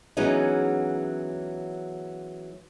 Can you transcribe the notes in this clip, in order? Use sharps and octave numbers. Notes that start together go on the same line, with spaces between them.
E3 F#3 G#3 B3 C#4 D#4